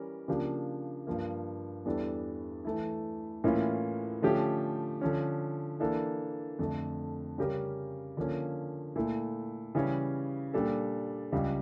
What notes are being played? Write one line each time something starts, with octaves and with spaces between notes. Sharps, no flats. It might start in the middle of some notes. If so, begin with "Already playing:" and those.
Already playing: E3 G3 C#4 A#4
C#3 F3 A#3 D4 G4
G2 F3 A#3
E2 E3 G3 D4 A4
E3 A3 E4
A2 E3 A#3 C#4 F4
D3 F3 A3 C#4 G4
D3 F3 C#4
E3 A#3 D4 A4
F2 D3 A3
C#3 G3 C#4 G4 A#4
D3 F3 A#3 C#4
A#2 A3 E4
C#3 E3 G3 C#4
A#2 G3 D4 A4
C#2 C#3 G3